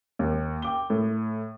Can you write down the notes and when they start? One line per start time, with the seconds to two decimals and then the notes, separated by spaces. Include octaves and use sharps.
0.19 D#2
0.62 G5 D6 G7
0.90 A2